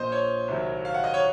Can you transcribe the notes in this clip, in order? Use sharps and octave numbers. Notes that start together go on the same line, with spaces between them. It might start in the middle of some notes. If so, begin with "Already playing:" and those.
Already playing: A#1 A#2 F3 C5 D#5
C#5
C2 C3 D#3 F#3
F5
F#5
D#5
C#5